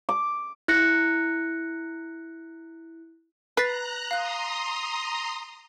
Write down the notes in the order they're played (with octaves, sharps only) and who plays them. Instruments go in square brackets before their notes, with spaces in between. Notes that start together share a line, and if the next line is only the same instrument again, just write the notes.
[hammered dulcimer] D6
[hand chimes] E4 F#6 A#6 C#7
[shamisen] B4 [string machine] A#5 F#6 [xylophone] A6 B6 C7
[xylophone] F5 F#6 [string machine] A#5 C6 D#6